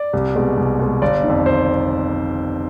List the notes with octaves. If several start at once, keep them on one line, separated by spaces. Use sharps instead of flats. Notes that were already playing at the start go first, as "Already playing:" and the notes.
Already playing: D5
C2
B2 G#3
C2
B2 G#3
G1 D5
F2 D#3
G1 C5